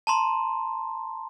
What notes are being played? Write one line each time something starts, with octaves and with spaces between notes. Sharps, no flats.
A5 A#5 C6